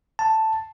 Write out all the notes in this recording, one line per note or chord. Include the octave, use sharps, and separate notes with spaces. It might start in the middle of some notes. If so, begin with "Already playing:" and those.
A5